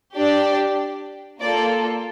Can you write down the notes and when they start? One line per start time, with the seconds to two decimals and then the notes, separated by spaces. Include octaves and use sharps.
0.16 D4 G4 D5
1.40 A#3 F4 A4 D5